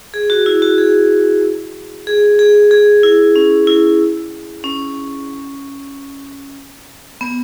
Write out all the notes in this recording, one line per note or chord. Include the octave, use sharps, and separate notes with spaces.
G#4
F#4
E4
F#4
G#4
G#4
G#4
G#4
E4
C#4
E4
C#4
B3